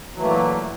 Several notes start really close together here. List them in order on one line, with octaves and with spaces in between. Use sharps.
F#3 E3 A3 A#3 A#2